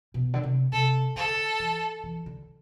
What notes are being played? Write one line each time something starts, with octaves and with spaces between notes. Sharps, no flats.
B2
D3
C3
C3 A4
D3 A4
E3
E3
D3